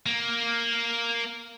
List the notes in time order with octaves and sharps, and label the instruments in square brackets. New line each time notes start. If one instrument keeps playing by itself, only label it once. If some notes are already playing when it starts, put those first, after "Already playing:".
[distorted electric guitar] A#3